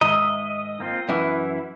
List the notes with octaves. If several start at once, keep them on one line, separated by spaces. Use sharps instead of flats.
G#2 D#3 D#5 E5 A#5
A#3 C4 F4
F#2 E3 E4